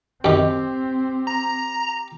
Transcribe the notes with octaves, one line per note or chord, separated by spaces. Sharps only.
F#2 D#3 C4 G4
A#5